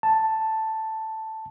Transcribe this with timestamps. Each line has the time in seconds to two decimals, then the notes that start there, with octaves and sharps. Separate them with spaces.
0.03 A5